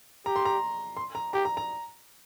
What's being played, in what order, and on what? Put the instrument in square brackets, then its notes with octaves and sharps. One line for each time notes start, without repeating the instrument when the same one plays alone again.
[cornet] G4 [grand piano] A#5
[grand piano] C6
A#5
C6
A#5
[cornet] G4 [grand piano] A#5
[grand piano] A#5
A#5